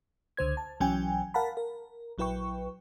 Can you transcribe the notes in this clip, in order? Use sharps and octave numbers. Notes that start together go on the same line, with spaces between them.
C#2 D3 C5 G#6
A5
B1 E3 F#3 C#4 G5 G#5
A#4 F5 F#5 A5 B5
A#4
A#1 F#3 E4 B4 G5 C#6